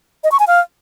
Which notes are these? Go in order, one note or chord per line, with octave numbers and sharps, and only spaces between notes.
D#5
C#6
G#5
F5